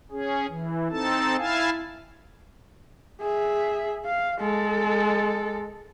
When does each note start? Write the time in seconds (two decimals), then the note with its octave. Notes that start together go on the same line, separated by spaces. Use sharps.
0.11 C#4 G#4
0.48 E3
0.90 C4 D#4 A4 A5
1.38 E4 F5 G#5 A5
3.21 G#4 E5
4.05 F5
4.40 G#3 A4